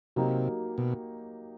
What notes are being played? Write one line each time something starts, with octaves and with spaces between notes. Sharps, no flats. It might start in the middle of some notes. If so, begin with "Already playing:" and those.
C3 F#3 A#3 D#4 G4
B2